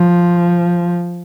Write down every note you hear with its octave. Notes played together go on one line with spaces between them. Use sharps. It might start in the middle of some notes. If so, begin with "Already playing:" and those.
Already playing: F3